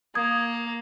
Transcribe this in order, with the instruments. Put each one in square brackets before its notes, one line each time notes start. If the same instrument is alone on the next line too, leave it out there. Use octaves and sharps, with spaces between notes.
[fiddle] A#3 [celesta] D#6 G#6